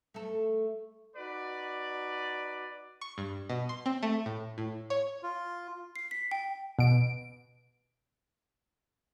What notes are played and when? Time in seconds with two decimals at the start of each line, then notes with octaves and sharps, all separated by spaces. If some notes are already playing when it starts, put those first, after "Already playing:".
0.14 A3 A4
1.17 D#4 F#4 B4 D5
3.01 C#6
3.18 G2
3.49 B2
3.69 C6
3.86 C4
4.03 A3
4.26 A2
4.58 A2
4.90 C#5
5.23 F4
5.96 C7
6.11 B6
6.31 G5
6.79 B2 D7